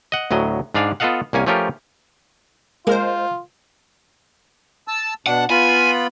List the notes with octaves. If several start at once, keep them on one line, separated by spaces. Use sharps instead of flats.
D#5 F#5
D2 A2 F#3 D#5
G#2 D4 D5 F5 G#5
B3 F4 A4 D#5 F5 F#5
C2 A#3 C#4 G#5
F3 A3 C#4 F4 G4 A#4
G#3 A#3 F4 G#4 A#4 C5
A5 E6
B2 D4 F#5
B3 F4 G#5 B5